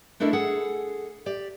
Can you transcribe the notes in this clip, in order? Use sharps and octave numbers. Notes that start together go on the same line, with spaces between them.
A3 D4 E4 A4 A#4 D#5
G#4 A4 F#5
G4 D5